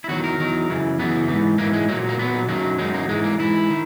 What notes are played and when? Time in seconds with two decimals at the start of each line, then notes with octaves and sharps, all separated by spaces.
0.04 E4
0.08 E2 D#3 F#3 F#4
0.24 A#4
0.39 E2 D#3 F#3
0.69 F#2 C#3 E3
0.99 F#2 C#3 E3 B3
1.28 G#2 E3
1.58 G#2 E3 A#3
1.73 G#3
1.89 A#2 F#3 A#3
2.09 A#3
2.19 A#2 F#3 B3
2.49 F#2 D#3 F#3 A#3
2.78 F#2 D#3 F#3 G#3
2.94 A#3
3.08 G#2 E3 G#3
3.24 A#3
3.38 G#2 E3 E4
3.70 D#3